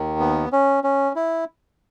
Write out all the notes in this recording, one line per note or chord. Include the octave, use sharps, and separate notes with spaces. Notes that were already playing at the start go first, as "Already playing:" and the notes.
Already playing: D#2 D#3
B3
C#4
C#4
E4